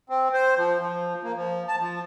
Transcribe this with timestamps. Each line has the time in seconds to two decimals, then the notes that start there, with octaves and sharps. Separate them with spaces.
0.09 C4
0.34 C5
0.57 F3
0.81 F3
1.23 A#3
1.36 F3
1.68 A5
1.80 F3